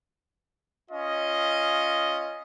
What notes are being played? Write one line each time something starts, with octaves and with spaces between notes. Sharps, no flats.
C#4 F4 D#5